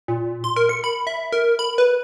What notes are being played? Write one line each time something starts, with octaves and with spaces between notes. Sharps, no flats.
A#2
C6
A#4
C#7
B5
E5
A#4
B5
B4